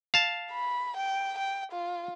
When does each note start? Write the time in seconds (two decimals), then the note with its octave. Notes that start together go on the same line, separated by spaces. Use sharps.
0.14 F5 A5
0.52 B5
0.96 G5
1.38 G5
1.72 F4